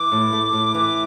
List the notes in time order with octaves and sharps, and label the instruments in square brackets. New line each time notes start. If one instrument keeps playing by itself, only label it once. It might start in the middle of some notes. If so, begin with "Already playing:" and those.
Already playing: [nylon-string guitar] E3 [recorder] D6
[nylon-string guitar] A2
A3
A2
E3